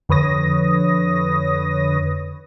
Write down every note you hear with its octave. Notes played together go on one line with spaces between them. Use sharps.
F2 D3 B4 C#5 D#6 A#6